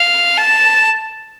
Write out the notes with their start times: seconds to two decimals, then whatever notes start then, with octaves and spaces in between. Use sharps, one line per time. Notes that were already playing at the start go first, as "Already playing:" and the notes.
Already playing: F5
0.38 A5